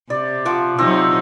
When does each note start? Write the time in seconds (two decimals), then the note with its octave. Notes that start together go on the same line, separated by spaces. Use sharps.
0.10 C3 D5
0.45 F3 F#5 D6
0.79 C3 F#3 C4 D#4